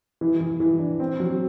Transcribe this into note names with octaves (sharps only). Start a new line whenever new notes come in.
E3
E3
E3
D4
C4
F#3